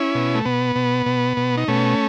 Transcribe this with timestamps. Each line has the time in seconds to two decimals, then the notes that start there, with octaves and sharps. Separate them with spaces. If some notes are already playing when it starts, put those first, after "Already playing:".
Already playing: C#4 E4
0.15 B2
0.35 A3
0.45 B2 B3
0.76 B2
1.06 B2
1.37 B2
1.57 D#4
1.68 B2 A3 C#4